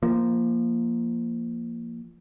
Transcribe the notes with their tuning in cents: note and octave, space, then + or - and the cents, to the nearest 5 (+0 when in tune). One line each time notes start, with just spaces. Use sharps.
F3 -15 A#3 +0